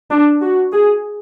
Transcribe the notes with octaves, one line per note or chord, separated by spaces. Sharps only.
D4
F#4
G#4